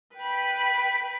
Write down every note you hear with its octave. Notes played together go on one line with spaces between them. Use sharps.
B4 G5 B5